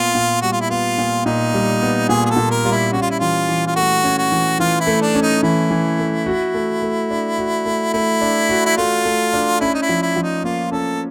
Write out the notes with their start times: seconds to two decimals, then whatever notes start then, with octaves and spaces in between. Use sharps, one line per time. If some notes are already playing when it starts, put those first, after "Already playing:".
Already playing: A#2 B3 F4
0.15 A#2
0.42 G3 F#4
0.52 F4
0.61 E4
0.70 B3 F4
0.98 A#2
1.26 A#2 D#4
1.54 G3
1.82 B3
2.09 A#2 G#4
2.26 G#4
2.30 A4
2.36 A#2
2.51 A#4
2.65 G3 F4
2.72 E4
2.92 C#4 F#4
3.02 F4
3.11 E4
3.20 E3 F4
3.49 E3
3.67 F4
3.76 A3 F#4
4.04 C#4
4.18 F#4
4.32 E3
4.60 E3 F4
4.80 E4
4.87 A3
5.02 D4
5.15 C#4
5.22 D#4
5.43 E3 E4
5.70 E3
5.99 A3
6.26 F#4
6.54 A3
6.82 A3
7.11 D4
7.38 F#4
7.65 A3
7.93 A3 E4
8.21 D4
8.49 F#4
8.66 E4
8.77 A3 F4
9.05 A3
9.34 D4
9.61 C#4 E4
9.74 D#4
9.82 E4
9.89 F3
10.02 E4
10.16 F3
10.23 D#4
10.44 A#3 F4
10.72 C#4 A4